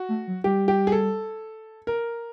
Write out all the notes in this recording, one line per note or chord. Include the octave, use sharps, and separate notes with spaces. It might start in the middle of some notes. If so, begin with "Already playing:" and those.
Already playing: F#4
A3
F#3
G3 G4
G4
G#4
A4
A#4